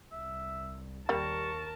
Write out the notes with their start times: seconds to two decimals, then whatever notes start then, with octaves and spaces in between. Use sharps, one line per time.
0.12 C2 E5
1.09 D#2 G3 A#3 A#4 A5 C#6